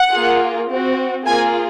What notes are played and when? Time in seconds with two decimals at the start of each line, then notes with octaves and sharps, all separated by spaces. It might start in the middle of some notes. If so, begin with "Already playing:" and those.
Already playing: F#5
0.12 A#3 F4 G#4
0.68 C4 F#4
1.25 A#3 F4 G#4 G#5